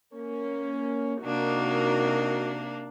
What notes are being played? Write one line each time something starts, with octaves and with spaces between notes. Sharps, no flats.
A#3 C#4
C3 A#3 D4 D#4 F#4 A#4